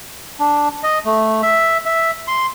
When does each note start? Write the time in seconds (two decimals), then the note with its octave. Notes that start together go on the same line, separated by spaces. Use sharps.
0.40 D4
0.83 D#5
1.05 A3
1.43 E5
1.85 E5
2.28 C6